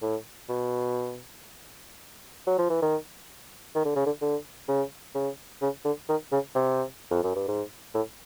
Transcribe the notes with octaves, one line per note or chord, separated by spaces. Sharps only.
A2
B2
F#3
F3
E3
D#3
D#3
D3
C#3
D3
D3
C#3
C#3
C#3
D3
D#3
C#3
C3
F2
F#2
G2
G#2
A2